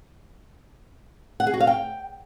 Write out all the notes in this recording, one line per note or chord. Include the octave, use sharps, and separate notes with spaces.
F#5
G#4
F#4
F5
G5